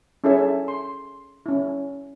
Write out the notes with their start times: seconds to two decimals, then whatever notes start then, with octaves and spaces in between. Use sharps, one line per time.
0.24 C#4 E4 G#4 A4 C#5 E5
0.68 C6
1.46 C#4 E4